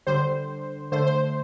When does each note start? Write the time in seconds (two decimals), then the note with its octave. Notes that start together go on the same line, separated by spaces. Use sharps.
0.07 D3 G3 C5
0.92 D3 A3 C5
1.06 C5